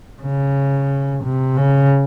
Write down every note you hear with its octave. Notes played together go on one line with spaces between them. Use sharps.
C#3
C3
C#3